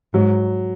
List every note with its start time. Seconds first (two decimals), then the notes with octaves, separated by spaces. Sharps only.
0.14 G#2 F#3